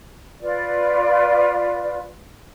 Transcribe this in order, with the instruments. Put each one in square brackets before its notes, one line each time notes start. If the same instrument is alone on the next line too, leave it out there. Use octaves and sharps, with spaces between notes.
[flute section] F4 B4 D5